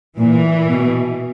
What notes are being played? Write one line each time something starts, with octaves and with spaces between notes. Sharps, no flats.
A#2 E3
B2